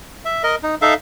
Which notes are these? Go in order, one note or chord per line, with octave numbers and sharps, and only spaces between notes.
E5
A#4 D#5
D#4
D#4 A4 E5 F5